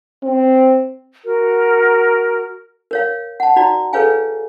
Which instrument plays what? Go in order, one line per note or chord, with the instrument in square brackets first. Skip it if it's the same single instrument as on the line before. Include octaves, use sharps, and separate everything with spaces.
[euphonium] C4
[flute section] F#4 A#4
[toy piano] A#4 C#5 F5
F#5 A5
D#4 F#4 D5 A#5
G#4 A4 B4 C#5 F5 G#5